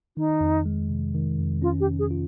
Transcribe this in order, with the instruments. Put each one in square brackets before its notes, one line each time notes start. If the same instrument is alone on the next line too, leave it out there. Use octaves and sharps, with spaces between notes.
[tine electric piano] D#3 [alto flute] D#4
[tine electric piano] F2
G#3
C3
D#3
F2
[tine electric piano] C#4 [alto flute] F4
[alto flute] G4
[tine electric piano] C3
[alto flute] G#4
[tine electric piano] F4